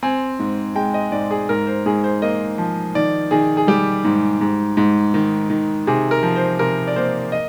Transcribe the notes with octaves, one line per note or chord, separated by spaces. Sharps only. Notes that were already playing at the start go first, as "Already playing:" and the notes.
C4 G#5
G#2
G#3 G5
D#5
G#2 D5
G#4
G#2 A#4
C5
G#2 G#4
C5
A#3 D#5
F3
D#3 D5
D#3 G#4
G#4
G3 G4
G#2
G#2
G#2
D#3
D#3
C3 G#4
A#4
F3
C5
C3 A#4
D5
A#3 C5
D#5